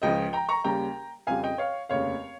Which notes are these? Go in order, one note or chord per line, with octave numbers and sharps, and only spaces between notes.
C#2 C#3 F3 D#5 G5
G5 A#5
A#5 C#6
D#2 C#3 G3 G5 A#5
F2 C#3 G3 F5 G#5
D#5 G5
C#5 F5
F1 D#2 C#3 C#5 F5